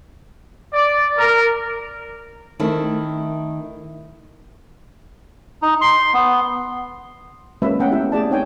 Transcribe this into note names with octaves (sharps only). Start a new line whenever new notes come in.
D5
A#4
D#3 A3 C4 E4
D#4
C6
B3
G#3 A#3 C#4 F#4 B4 E5
A3 B3 C#4 F#5 G5 A#5
E4 G4 E5
A3 G#4 D5 A5
C4 D#4 C#5 G5 G#5